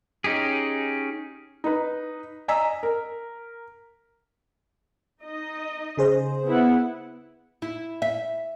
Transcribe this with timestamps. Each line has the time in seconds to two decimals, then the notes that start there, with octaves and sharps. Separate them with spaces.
0.24 C#4 D#4 G4 G#4
1.64 D#4 B4
2.48 D#5 G#5 A#5 E6 B6
2.83 A#4
5.21 D#4 D#5
5.98 C#3 G#4 C5
6.46 B3 E4 F#5
7.62 E4
8.02 E5